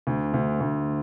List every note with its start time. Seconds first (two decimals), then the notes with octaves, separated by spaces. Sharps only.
0.07 D2
0.34 D2
0.60 D2